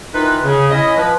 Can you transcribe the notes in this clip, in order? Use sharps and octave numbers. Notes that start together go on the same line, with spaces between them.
D#3 E3 D#4 F4 B4
C#3
C#4 E4 D#5
F3 B4